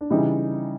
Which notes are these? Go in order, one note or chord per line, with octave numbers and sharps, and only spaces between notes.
D4
C#3 E3 G3 D#4